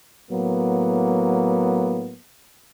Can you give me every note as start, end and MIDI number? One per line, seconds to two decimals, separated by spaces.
0.31 2.15 45
0.31 2.15 54
0.31 2.15 58
0.31 2.15 59